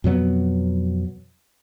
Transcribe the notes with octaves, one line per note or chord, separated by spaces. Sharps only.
F2 B2 F#3 B3